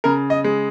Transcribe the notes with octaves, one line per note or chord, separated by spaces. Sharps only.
C#3 A#4
D#5
G#3